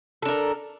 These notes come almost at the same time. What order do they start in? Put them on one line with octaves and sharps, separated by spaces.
A4 D4 A#4